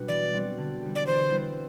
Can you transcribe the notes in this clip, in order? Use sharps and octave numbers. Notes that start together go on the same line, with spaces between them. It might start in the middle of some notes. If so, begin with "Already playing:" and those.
Already playing: B2 G3 B3 D4 F#4
E3 D5
G3 C4 F#4
D3
G3 D4 G4
D5
E3 C5
G3 B3 E4